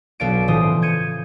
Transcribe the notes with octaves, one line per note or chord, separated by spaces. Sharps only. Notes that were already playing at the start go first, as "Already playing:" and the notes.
B1 B3 D4 F5 A6 D7
A2 C#3 E3 F3 C5 D#6
G6 G#6 C#7 D#7